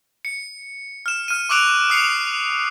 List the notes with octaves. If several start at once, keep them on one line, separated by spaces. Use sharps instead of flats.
C#7
F6 E7
F6 D#7
C#6 D6 E6 F#6 D7 F7
D#6 C7 C#7 F7